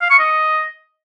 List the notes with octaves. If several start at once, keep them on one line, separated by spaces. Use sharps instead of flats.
F5
C#6
D#5